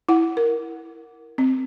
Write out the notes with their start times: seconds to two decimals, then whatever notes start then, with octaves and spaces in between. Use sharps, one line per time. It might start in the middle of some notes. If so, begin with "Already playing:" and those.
0.09 E4 F#5
0.37 A#4
1.38 C4